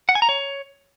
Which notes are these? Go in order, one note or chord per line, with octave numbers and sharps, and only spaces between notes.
F#5
G#5
A#5
C#5